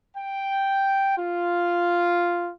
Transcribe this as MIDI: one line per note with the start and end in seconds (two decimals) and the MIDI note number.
0.17 1.13 79
1.18 2.52 65